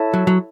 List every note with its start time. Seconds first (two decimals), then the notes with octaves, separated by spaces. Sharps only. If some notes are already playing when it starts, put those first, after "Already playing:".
Already playing: E4 A4 C#5 E5 A5
0.14 F#3
0.27 F#3